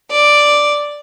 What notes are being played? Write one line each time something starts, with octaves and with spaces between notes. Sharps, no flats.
D5